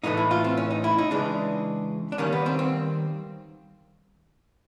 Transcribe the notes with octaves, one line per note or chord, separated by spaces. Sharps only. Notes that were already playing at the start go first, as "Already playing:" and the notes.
A2 E3 A3 D#4
E4
F4
C4
C#4
D#4
E4
D#4
C#3 E3 G#3 D4
D4
D#3 G3 A#3 C#4
B3
C4
C4